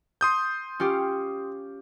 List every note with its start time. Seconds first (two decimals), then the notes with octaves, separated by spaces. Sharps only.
0.21 C6 D#6 G6
0.80 C#4 F4 G4